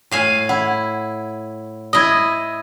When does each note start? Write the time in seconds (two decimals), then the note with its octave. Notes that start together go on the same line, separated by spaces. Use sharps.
0.11 A2 F5 G#5
0.49 E4 F#5
1.93 E4 D#5 D#6 G#6